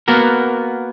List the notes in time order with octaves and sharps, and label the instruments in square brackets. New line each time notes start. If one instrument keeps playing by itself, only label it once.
[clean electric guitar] A#3 B3 F#4 A#4